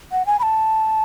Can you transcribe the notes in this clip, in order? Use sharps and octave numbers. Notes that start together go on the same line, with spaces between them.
F#5
G#5
B5
A5